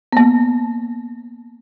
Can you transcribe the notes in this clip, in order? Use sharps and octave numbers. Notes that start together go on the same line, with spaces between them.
A#3 B3